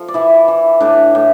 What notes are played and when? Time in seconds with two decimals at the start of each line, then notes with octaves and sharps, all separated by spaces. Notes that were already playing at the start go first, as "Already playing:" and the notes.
Already playing: F3 A4
0.08 D5
0.14 E3 E4 E5
0.48 E3
0.80 A2 D4 D5
1.15 A2